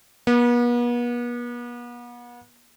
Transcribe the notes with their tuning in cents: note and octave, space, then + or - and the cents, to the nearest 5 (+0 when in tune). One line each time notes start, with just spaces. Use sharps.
B3 -40